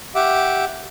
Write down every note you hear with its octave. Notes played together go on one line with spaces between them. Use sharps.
G4 E5 F#5 D6